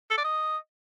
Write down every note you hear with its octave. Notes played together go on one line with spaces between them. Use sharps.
A4
D5
D#5